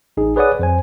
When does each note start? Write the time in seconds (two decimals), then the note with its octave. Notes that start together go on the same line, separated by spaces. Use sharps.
0.17 A1 D#4 G#4
0.36 G#4 B4 C#5 D5 F#5 D#6
0.59 F2 C5 G#5